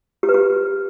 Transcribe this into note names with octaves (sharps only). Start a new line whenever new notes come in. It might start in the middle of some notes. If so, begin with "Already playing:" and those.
G4
B4
G4